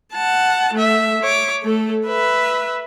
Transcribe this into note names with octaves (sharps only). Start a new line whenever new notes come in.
F#5 A5
A3 E5
C#5 D6
A3 A4
B4 E5